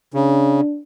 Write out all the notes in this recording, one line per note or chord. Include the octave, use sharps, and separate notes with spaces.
C#3 D4